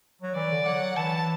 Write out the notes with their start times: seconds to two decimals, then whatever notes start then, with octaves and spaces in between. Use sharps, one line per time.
0.22 F#3
0.35 E3 D5
0.51 D3
0.66 F#3 F#5
0.96 E3 A5